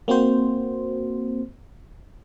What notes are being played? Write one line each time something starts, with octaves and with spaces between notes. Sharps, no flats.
A#3 C4 F#4 C5